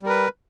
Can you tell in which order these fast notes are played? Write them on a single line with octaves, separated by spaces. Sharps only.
G3 A#4 B4